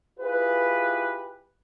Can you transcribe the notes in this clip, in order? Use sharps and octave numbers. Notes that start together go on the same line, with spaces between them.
E4 F4 G4 G#4 B4